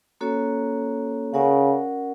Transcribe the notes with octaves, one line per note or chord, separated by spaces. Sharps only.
A#3 C#4 F#4 A4 C#5
C#3 C#4 F#4 A#4 D5 F#5